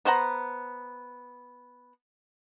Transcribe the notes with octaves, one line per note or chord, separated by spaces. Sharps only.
B3 C5 F#5 A#5